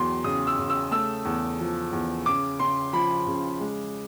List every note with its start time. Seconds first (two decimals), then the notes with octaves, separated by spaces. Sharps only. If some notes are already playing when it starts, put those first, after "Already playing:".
Already playing: E2 F#3 C6
0.24 C#3 D#6
0.47 E6
0.58 C#3
0.70 E6
0.91 A3 E6
1.25 E2
1.60 F3
1.93 E2
2.26 C#3 D6
2.60 C#3 C6
2.93 F3 B5
3.27 C#3
3.60 G#3